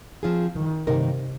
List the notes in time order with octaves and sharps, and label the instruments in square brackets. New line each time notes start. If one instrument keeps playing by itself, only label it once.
[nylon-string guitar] F3 C4 F4 G#4
[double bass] D#3
[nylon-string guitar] G2 D#3 A#3 D#4 A#4 [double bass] C3